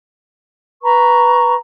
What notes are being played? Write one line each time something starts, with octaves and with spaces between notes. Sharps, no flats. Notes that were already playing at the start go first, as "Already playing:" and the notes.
B4 A#5 B5 C#6